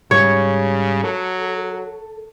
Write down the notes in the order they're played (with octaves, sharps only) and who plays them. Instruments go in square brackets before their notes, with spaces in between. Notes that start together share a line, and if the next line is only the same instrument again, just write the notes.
[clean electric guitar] G#2 G3 [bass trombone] C#3 [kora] C#5
[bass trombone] F#3 [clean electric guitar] A4